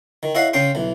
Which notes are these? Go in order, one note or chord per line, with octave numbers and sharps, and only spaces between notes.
D#3
E4 G#4 C#5 D#5 F5 F#5
C#3 C#4 G#4 G5 C6
B1 E3